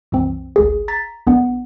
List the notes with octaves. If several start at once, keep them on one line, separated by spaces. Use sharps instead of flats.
C2 F#2 E3 C4
G#1 C#2 G#4
A#5 A6 B6
A#1 B3 D4 F#5